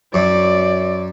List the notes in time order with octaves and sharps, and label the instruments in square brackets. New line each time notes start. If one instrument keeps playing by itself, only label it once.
[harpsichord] F#2 [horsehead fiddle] D5